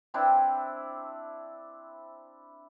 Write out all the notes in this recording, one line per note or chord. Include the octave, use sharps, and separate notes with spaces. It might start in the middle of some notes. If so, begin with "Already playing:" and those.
C4 D4 E4 C5